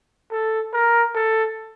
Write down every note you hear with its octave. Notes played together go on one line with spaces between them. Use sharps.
A4
A#4
A4